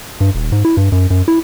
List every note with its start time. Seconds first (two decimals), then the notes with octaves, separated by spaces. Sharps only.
0.20 G2
0.35 D#1
0.52 G#2
0.65 E4
0.77 G2
0.92 F#2
1.10 F#2
1.28 E4